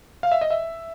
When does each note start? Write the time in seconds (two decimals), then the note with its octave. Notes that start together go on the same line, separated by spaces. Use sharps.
0.23 F5
0.32 E5
0.41 D#5
0.51 E5